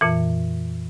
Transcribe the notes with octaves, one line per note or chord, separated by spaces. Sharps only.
F2 A#2 E3